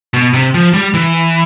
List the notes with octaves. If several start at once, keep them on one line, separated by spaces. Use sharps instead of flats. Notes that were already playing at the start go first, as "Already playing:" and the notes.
B2
C3
F3
G3
E3